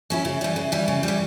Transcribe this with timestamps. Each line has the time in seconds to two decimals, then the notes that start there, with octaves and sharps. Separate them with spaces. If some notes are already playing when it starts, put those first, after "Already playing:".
0.10 F#3 C#4 E4
0.25 C#3
0.41 E3 G3
0.56 C#3
0.72 E3 G3
0.88 C#3
1.03 E3 G3